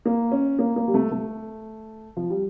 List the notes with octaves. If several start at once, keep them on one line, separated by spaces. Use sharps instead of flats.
A#3
C#4
A#3
A#3
G3
A3
A3
F3
G3